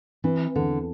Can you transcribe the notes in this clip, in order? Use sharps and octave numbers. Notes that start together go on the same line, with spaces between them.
E3 C4
E2 D3